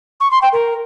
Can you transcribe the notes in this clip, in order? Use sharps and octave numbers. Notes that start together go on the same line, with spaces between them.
C#6
C6
G5
A#4